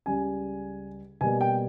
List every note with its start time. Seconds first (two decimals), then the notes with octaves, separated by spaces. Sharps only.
0.06 C#2 C#3 G3 G#5
1.21 B2 G3 A#3 G#5
1.41 G5